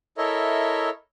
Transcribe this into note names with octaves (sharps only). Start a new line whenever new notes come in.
E4 A4 A#4 C#5 D#5 E5